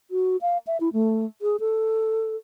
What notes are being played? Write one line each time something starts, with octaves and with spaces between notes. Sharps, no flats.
F#4
F5
E5
E4
A3
G#4
A4